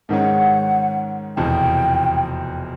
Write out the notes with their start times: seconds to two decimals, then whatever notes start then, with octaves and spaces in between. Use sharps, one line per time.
0.09 G#2 D#3 G#3 C#4 F#5
1.37 F1 E2 B2 G5